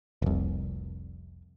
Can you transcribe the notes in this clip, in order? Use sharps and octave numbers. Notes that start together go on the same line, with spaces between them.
F1 C2